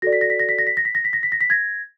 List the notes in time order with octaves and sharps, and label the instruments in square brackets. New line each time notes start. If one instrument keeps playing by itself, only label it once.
[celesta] F#4 A4 D5 A#6
B6
A#6
B6
A#6
B6
A#6
B6
A#6
B6
A#6
B6
A#6
B6
A#6
B6
G#6 A#6